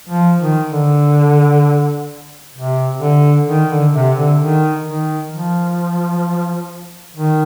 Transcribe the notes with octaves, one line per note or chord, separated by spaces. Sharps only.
F3
D#3
D3
C3
D3
D#3
D3
C3
D3
D#3
D#3
F3
D#3